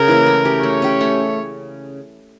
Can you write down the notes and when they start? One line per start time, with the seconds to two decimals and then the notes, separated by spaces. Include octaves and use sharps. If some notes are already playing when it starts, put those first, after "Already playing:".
Already playing: C#3 A#4
0.08 E3 A#3 E4
0.26 A3
0.45 C#4 G4
0.63 A3 C#5
0.82 C#4 G4
1.01 A3